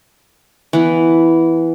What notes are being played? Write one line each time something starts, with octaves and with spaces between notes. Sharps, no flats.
E3 B3